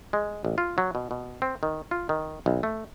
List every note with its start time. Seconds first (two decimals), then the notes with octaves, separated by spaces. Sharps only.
0.13 G#3
0.45 A1
0.58 F4
0.78 F#3
0.95 B2
1.11 B2
1.42 C4
1.63 D#3
1.91 F4
2.09 D#3
2.46 B1
2.63 A3